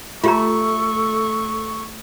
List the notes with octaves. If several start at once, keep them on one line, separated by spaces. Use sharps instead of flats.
A3 F4 G4 A4 A#5 C#6